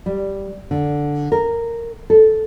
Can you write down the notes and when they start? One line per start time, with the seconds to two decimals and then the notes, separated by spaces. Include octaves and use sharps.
0.06 G3
0.71 D3
1.32 A#4
2.10 A4